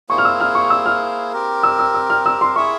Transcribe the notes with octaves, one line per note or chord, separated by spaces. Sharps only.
A#3 E4 G#4 C5 C#6
F6
E6
F6
C#6
E6
F6
C4 G4 A#4
E6
E6
E6
F6
E6
C6
E4 G#4 E5 C#6